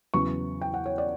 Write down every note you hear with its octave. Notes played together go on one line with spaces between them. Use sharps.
E2 C#3 F#3 B3 C#6
G5
F#5
C#5
D5